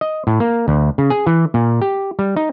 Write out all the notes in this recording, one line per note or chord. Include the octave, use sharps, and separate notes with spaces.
D#5
A2
A#3
D2
C#3
G#4
E3
A#2
G4
G3
D#4